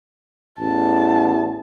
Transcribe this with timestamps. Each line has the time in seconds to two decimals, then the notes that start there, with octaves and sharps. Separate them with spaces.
0.59 A1 E2 A5